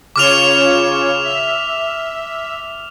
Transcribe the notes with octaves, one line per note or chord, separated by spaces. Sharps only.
C#3 F4 C#5 D6 F6 F7
E5